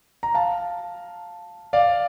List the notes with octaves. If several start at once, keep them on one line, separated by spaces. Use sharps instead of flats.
A#5
F5 A5
D5 F5